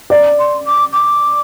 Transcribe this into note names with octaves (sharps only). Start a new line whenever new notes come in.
D5 A#5
C6
D6
D6